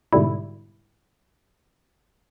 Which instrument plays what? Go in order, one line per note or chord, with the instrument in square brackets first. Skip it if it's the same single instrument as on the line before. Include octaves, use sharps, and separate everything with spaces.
[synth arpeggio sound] G#2 B2 D3 G3 E4